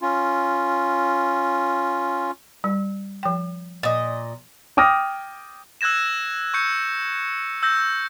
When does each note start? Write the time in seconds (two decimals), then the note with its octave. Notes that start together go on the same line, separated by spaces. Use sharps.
0.01 C#4 F4
2.64 G3
3.23 F3 G5
3.83 A#2 D#5
4.77 G5 D6 D#6 F6 A#6
5.81 E6 F#6 G#6 A#6 E7
6.54 C#6 G6 C#7
7.63 E6 G6 A#6